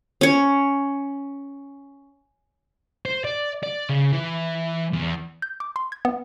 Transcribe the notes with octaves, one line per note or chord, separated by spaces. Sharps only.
C#4 C#5
C5
D5
D5
C#3
E3
E2
G6
D6
C6
G#6
B3